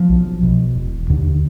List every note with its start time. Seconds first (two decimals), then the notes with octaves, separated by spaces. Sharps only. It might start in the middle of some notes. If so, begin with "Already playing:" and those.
Already playing: F3
0.09 B1
0.43 B2
0.75 E1
1.10 D#2 D3